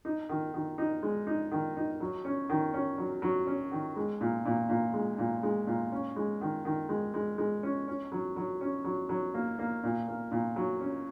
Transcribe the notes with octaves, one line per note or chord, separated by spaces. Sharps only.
D#4
D#3
D#3
D#4
G#3
D#4
D#3
D#4
F#3
C#4
D#3
C#4
F#3
F#3
C#4
D#3
G#3
A#2
A#2
A#2
G#3
A#2
G#3
A#2
C#4
G#3
D#3
D#3
G#3
G#3
G#3
C#4
C#4
F#3
F#3
C#4
F#3
F#3
A#3
A#3
A#2
A#3
A#2
F#3
C#4